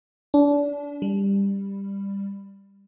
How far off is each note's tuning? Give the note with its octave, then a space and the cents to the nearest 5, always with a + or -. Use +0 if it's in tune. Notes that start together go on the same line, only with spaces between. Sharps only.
D4 -30
G3 +15